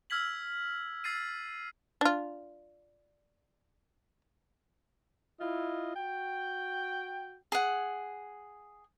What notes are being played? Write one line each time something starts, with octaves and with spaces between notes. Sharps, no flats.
E6 F6 G#6 B6 F#7
E6 A6 C7 D#7
D4 F4
E4 F4 D#5
F#4 G5
G#4 F#5